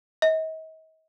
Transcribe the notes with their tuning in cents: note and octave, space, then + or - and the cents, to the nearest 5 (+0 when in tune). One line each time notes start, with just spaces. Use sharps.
D#5 +40